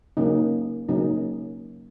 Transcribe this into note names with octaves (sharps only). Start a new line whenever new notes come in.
C#3 F#3 A#3 C#4 D#4
C#3 F#3 A#3 C#4 D#4